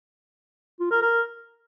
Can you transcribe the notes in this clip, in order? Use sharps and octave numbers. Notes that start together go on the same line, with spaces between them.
F4
A#4
A#4